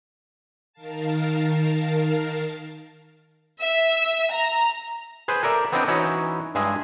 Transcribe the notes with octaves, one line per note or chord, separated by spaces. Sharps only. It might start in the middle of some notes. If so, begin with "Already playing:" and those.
D#3 A#4 F5 A5
E5
A#5
G#4 B4 C5
A4 A#4 D5 E5 A5
B3 C4 D4 E4 D#5 G5
E3 C#4 D#4 E4 F#4 C#5
G2 G#3 G#4 E5